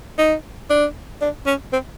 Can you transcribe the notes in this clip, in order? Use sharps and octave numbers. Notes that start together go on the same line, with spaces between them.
D#4
D4
D4
C#4
C4